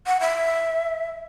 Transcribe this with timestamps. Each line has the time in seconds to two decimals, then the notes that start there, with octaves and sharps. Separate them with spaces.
0.06 F#5
0.21 E5